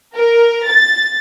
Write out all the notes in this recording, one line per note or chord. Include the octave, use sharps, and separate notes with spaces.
A#4
A6